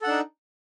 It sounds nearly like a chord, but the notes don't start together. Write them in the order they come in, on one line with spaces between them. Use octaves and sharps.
A4 F#5 D4 D#4